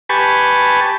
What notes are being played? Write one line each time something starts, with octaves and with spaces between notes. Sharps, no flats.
G4 B4 G#5 A5 B5 C#6